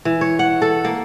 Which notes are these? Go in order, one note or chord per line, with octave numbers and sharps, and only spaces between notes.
E3
C#5
F#5
A4
A#3